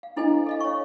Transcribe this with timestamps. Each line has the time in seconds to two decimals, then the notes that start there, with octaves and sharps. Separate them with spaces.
0.03 F5
0.16 D4 E4 A4 C5 D#5 G#5
0.47 A4 D#5 F5
0.60 C#5 C#6